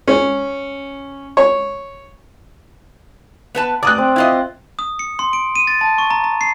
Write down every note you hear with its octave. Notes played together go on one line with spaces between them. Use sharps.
C#4
C#5
B3 B4 A5
D5 D6 D#6 F#6
C4
E4 F4 D#5
D#6
C#7
C6
D7
D#7
A6
A5
C#6
A#5
A#5
C7